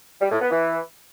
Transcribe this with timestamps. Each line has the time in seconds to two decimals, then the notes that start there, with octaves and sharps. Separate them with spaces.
0.21 G3
0.31 A2
0.41 B3
0.51 E3